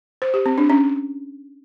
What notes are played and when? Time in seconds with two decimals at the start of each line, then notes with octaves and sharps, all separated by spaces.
0.22 C5
0.34 G4
0.46 C4
0.58 D4
0.70 C#4